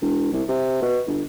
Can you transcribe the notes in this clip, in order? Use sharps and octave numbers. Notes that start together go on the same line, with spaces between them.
E1
C2
C3
B2
G1